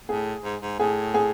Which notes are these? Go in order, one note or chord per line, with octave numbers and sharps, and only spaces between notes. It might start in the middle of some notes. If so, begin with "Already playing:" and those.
A2 G#4
G#2
G#2
A2 G#4
G#4